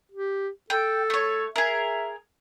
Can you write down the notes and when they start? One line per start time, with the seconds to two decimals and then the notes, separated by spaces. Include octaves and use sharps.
0.12 G4
0.70 A4 G5
1.10 A3 C#5
1.56 G#4 A#4 E5